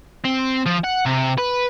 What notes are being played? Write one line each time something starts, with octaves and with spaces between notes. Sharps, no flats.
C4
F3
F#5
C3
B4